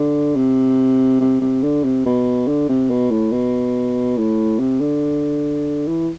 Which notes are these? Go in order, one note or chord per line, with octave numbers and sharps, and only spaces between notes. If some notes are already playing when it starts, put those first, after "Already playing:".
Already playing: D3
C3
C3
C3
D3
C3
B2
D3
C3
B2
A2
B2
A2
C3
D3
E3